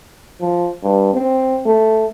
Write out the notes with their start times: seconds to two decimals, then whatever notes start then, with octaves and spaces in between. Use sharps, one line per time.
0.41 F3
0.84 G2
1.14 C4
1.66 A3